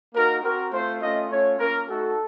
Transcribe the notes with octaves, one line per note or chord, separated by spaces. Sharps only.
A#3 D#4 F#4 A#4
C4 F#4 A#4
A3 C4 F4 C5
A3 C#4 F4 D#5
A3 C#4 F4 C#5
A#3 C#4 F4 A#4
A3 D#4 F#4 A4